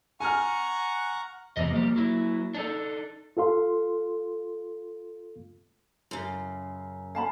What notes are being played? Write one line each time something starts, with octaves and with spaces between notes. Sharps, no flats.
F#5 G#5 A#5 C#6 F6
E2 C3 G4 D#5
F3 G3 A#3 G4
F#3 E4
D4 D#4 A4
F4 A4 F5 C6
F#2 C#3
F5 A5 B5